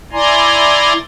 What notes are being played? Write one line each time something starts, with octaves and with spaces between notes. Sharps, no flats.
E4 D5 G#5 A#5 C6